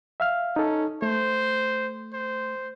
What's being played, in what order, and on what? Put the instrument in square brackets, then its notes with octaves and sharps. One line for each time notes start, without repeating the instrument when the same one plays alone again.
[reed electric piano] E5 F5 F6
[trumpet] C#4 [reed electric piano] D#4 A4
[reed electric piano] A3 [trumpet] C5
[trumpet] C5